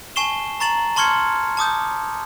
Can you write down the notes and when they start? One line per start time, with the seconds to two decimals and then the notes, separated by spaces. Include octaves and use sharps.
0.16 G#5 A5 C#6 C7 E7 G7
0.60 A#5 C#6 A6 E7 F#7
0.96 A5 C6 C#6 F6 G#6 C#7
1.57 A5 D6 D#6 G6